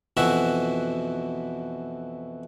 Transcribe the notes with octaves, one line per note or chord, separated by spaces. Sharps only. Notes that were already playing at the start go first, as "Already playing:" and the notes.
F2 B2 E3 E4 F#4 E5